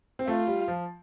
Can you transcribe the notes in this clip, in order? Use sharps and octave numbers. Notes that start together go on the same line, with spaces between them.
C4
A3 F4
G3
F3